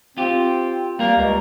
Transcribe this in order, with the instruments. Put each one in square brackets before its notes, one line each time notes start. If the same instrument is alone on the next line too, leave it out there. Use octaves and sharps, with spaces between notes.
[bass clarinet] C4 [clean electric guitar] F4 G4
[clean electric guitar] G3 A#4 [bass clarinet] A#3
[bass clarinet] C#2